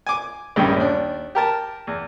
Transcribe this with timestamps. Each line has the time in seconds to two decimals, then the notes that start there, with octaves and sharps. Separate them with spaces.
0.07 G#5 D6
0.56 A#1 G2 D#3 G3 C#4 G4
0.76 D#2 D4
1.35 G4 A#4 A5
1.87 E2